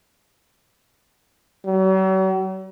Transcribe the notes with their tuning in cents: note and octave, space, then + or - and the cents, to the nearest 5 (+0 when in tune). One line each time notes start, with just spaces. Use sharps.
F#3 +45